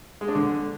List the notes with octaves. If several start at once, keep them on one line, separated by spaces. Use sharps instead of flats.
G#3
D4
D3